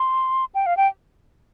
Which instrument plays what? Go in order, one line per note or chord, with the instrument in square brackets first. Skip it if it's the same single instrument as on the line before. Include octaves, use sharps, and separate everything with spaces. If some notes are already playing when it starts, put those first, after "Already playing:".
Already playing: [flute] C6
G5
F5
G5